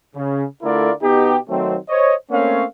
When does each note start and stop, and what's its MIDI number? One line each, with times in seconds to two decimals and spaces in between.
0.16 0.45 49
0.62 0.91 50
0.62 0.91 57
0.62 0.91 64
0.62 0.91 65
0.62 0.91 70
0.62 0.91 74
1.03 1.38 47
1.03 1.38 59
1.03 1.38 63
1.03 1.38 67
1.49 1.75 51
1.49 1.75 54
1.49 1.75 57
1.49 1.75 60
1.89 2.14 72
1.89 2.14 73
1.89 2.14 75
2.30 2.64 57
2.30 2.64 58
2.30 2.64 60
2.30 2.64 61
2.30 2.64 73
2.30 2.64 77